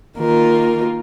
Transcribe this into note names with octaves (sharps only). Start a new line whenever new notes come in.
D#3 A#3 F4 A#4